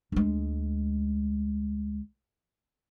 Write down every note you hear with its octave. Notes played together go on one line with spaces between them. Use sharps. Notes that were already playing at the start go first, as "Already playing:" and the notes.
D2 G#3